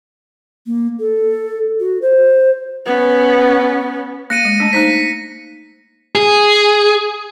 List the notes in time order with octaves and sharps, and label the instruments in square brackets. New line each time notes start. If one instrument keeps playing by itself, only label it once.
[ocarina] A#3
A4
F#4
C5
[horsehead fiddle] B3 C#4
[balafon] A#3 [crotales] A#6 C#7 D#7
[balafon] G#3
A3 D4 A5
[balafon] A#3 D#4 C5 [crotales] B6
[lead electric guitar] G#4